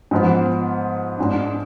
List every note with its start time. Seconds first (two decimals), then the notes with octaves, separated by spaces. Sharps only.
0.11 G#2 F3 B3
1.18 G#2 G#3 D4